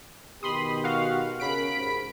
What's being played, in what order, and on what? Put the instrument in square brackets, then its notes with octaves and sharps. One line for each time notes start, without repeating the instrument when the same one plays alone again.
[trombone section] B2 D#3 G4 [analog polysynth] B5 C6 D#6
[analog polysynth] F#4 F5 F#5
[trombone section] C#3 C#4 A#4 [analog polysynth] B5 B6 D7
[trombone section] G#2